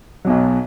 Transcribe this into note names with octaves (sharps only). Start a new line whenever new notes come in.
B1 B2 F#3